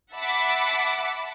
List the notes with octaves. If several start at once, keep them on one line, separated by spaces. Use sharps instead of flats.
E5 F#5 A5 B5 D6